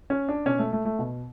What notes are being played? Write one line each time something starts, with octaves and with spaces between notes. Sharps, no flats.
C#4
D4
B2 C#4
A3
A3
A3
B2